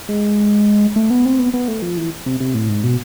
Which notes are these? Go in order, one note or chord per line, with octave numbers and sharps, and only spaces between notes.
G#3
A3
B3
C4
B3
B3
A3
F3
E3
C3
C3
A2
G#2
B2